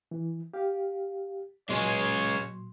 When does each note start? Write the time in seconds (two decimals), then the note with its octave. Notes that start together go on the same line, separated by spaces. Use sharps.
0.11 E3
0.53 G4 F5
1.69 A#2 F#3 G#3 C#4 C#5 C6